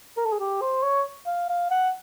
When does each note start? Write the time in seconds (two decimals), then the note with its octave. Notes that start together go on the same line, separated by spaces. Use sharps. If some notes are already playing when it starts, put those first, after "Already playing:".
0.17 A#4
0.25 A4
0.32 G#4
0.40 G4
0.61 C5
0.82 C#5
1.26 F5
1.49 F5
1.70 F#5